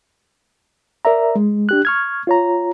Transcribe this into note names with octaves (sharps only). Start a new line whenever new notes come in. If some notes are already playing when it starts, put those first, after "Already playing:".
A#4 D5 E5 A#5
G#3
D4 G4 F#6
C#6 F6 G#6
F4 C#5 A#5